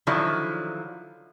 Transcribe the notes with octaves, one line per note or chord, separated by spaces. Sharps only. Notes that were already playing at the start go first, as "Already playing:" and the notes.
D3 D#3 F3 F#3 E4